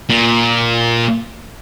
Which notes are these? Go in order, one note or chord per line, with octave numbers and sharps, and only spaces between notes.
A#2